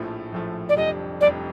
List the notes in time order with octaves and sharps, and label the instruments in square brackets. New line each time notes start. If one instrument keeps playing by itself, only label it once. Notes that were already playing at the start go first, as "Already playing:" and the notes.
Already playing: [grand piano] A#1 A2 F3 A3
A#1 A2 F3 A3
[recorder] D5
[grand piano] F1 F2 C3 G3 D4 [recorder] D#5
[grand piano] F1 F2 C3 G3 D4 [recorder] D5